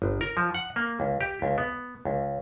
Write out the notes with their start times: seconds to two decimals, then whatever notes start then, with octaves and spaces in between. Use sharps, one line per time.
0.02 G1
0.21 A#4
0.37 F3
0.54 F#5
0.76 A#3
1.00 C#2
1.21 G4
1.42 C#2
1.58 B3
2.05 C#2